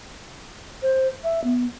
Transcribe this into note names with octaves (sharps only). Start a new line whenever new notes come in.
C5
E5
B3